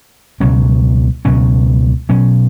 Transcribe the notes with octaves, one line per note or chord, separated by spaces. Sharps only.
C#2 B2 F#3 C#4
C#2 B2 F#3 C#4
B2 F#3 C#4